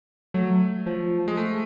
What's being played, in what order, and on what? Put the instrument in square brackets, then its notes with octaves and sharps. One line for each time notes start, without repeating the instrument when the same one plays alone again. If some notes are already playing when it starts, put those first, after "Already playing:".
[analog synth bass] F#3 [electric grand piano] A3
[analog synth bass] F3
[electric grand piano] G#3
A3